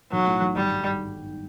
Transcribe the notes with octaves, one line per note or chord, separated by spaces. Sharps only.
B1 F#3
A2
B1
G#1 G3
G2